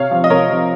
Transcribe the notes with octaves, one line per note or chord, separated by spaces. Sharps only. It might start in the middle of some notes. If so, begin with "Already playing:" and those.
Already playing: C3 C#5 F5
F3
D#5
C3 A#4 C#5
F3